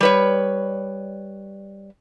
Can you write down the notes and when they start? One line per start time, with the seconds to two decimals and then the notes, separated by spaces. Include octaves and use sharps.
0.01 G3 B4 C#5